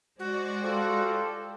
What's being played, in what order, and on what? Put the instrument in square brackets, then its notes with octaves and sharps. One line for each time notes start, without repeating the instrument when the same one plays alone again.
[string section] G#3 C5 D5 [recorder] F#4
[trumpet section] F4 G4 A4